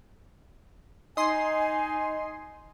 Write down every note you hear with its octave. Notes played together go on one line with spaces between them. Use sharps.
D#4 D#5 G#5 C6